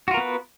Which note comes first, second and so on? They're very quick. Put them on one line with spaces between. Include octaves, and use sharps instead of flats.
F#4 F4 A#4 B3 B4